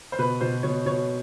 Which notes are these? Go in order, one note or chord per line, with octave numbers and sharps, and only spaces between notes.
C5
B2 B4
B2 C5
B2 C#5
B2 C#5